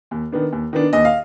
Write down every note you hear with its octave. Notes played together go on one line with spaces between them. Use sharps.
D#2
D#3 B3 D4
D#2
D#3 B3 D4
D#2 D#5
F5